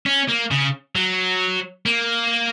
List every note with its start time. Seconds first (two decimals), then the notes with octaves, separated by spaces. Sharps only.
0.06 C#4
0.28 A#3
0.51 C#3
0.95 F#3
1.86 A#3